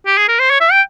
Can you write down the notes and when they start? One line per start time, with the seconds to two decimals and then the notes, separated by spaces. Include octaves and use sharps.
0.07 G4
0.18 G#4
0.28 A#4
0.39 C5
0.50 C#5
0.61 E5
0.72 G5